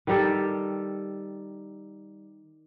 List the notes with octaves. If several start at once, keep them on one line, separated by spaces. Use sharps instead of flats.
D#3 G3 G4 A4